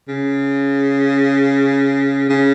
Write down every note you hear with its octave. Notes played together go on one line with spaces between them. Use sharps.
C#3
C#3